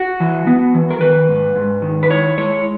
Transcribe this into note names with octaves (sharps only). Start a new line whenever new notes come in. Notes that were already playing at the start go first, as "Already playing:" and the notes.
Already playing: F#4
E3
B3
E3
A#4
D#3 B4
G#2
G#2
D#3
B4
E4 C#5
G#3 C#5